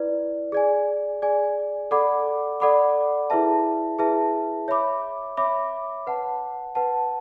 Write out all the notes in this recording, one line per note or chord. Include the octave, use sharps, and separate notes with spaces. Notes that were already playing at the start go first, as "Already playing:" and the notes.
Already playing: E4 B4 D5
G#4 D5 G#5
G#4 D5 G#5
A4 D5 F#5 B5 D6
A4 D5 F#5 B5 D6
E4 G#4 B4 E5 A5
E4 G#4 B4 E5 A5
C#5 E5 B5 D6
C#5 E5 B5 D6
B4 F#5 A5
B4 F#5 A5